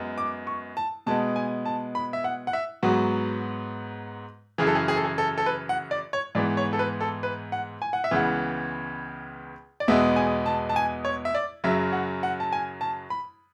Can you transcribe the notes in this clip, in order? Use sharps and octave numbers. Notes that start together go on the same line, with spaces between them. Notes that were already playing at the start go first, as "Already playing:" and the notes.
Already playing: F#2 G#3 B3
D6
C#6
A5
B2 G#3 B3 A5
G#5
A5
B5
E5
F#5
F#5
E5
G#2 F#3 B3 F#4
F#2 C#3 E3 G#4
A4
G#4
G#4
A4
G#4
A4
A4
B4
F#5
D5
C#5
G#2 E3 B3 D5
C#5
A4
B4
A4
B4
F#5
G#5
F#5
E5
C#2 C#3 E3 B3 F#5
D5
E2 B2 G#3 B3 E5
G#5
A5
A5
G#5
C#5
E5
D5
F#2 C#3 F#3 E5
F#5
F#5
A5
G#5
A5
B5